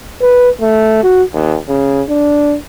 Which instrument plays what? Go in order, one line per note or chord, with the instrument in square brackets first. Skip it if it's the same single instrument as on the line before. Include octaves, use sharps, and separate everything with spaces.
[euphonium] B4
A3
F#4
D#2
C#3
D4